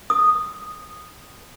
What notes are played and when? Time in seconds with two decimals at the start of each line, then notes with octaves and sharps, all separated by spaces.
0.10 D#6